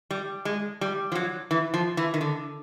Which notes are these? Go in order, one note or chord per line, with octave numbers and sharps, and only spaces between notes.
G3
G#3
G3
F3
F#3
E3
F3
E3
D#3
D3